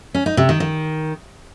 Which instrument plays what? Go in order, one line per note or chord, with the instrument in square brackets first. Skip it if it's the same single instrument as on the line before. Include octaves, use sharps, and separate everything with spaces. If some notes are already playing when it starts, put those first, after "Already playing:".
[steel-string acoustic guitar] C#4
D#4
C3
D#3
D#3